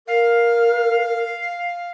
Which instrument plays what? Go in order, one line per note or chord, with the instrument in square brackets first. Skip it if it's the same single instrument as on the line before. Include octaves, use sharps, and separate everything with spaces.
[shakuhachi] A#4 [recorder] F5